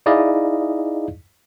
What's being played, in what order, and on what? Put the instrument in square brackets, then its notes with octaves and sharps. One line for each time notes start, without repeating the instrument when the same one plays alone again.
[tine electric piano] D#4 E4 G#4 D5 D#5 F5